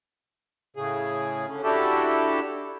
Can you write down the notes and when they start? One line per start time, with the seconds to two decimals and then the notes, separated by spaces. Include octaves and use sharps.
0.76 A2 C#3 G#4
1.48 D3 C#4
1.63 D4 E4 F#4 G4 A4